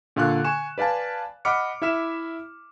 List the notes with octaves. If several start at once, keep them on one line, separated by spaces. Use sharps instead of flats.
A#2 D3 F5 C#6 F#6
G#5 C#6 E7
B4 D5 F5 G#5 A5
D#5 F#5 B5 D6 F6 C#7
E4 E5 F6 E7